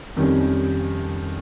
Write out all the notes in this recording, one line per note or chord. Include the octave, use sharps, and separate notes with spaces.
F2 D#3 G3 C#4